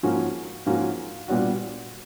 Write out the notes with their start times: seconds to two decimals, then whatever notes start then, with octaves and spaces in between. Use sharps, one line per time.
0.03 G#2 F3 A#3 C#4 F#4
0.66 G#2 F3 A#3 C#4 F#4
1.28 A#2 G3 B3 D4 F#4